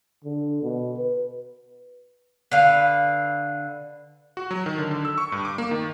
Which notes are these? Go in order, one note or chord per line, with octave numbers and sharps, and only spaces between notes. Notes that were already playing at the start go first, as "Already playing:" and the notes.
D3
B2
B4
D3 B4 F5
F#4
F#3
D#3
D3
D3
E6
C#6
G2
D6
A#3
D#3